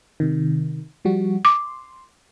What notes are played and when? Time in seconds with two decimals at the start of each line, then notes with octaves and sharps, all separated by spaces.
0.20 C3 D#3
1.05 F3 G3 F#4
1.45 C6 D6